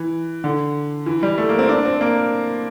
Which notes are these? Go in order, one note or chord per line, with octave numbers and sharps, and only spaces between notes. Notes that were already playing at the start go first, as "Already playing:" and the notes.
Already playing: E3
D3
E3
G3
A3
A#3
C4
D4
C4
A#3